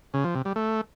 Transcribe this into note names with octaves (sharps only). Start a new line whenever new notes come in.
C#3
F3
C3
G3
A3